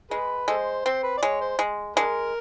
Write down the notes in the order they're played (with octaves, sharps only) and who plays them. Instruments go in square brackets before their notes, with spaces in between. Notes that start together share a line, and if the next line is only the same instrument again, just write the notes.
[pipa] G#3 [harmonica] G#4 B4
[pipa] G#3 [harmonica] A4 C5
[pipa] C4 [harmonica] C5
[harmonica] B4
D5
[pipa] G#3 [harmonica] C#5
[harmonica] C5
[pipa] G#3
[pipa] G#3 [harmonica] D4 A#4